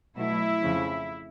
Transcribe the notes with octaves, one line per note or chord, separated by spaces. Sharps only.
B2 F#3 A3 E4
F2 C#3 F3